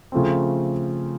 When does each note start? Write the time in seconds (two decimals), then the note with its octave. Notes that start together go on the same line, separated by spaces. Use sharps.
0.12 C#3 F3 A3 C4